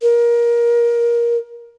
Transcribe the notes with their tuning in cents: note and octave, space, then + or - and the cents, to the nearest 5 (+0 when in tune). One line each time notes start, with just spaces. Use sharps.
A#4 +20